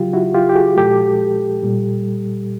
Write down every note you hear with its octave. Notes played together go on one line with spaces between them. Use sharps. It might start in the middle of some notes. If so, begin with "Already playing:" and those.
Already playing: C#3 F#3 F4 G4
E4 F#4
F4 G4
G4
F#4 G#4
A#2 F3 G#3 G4 A4
A#2 G3